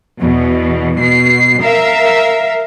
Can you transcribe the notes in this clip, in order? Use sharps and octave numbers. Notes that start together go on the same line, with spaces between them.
E2 B2
B2 C7
A#4 E5 F5